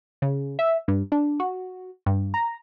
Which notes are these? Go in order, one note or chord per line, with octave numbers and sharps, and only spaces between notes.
C#3
E5
G2
D4
F#4
G2
A#5